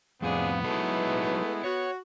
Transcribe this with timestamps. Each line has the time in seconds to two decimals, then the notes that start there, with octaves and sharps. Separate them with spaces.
0.22 F2 A2 C3 B3 C4 D4 G#4 F5
0.64 F#3 G#3 A3 D#4 E4 A4 B4
1.64 F#4 C#5